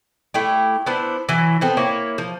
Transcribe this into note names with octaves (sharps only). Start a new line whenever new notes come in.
A3 E4 G4
B3 D4 E4 C5
E3 F#3 E4
B3 C4 A4
A#3 E4 C#5
F3